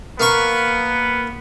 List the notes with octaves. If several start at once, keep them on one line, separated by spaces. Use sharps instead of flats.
A#3 B3 C#6